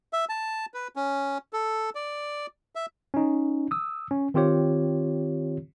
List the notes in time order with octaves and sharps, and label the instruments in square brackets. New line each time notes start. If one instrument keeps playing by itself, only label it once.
[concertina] E5
A5
B4
C#4
A4
D5
E5
[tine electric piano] C#4 D#4
D#6 E6
C#4
D#3 C4 F4 G4 C#5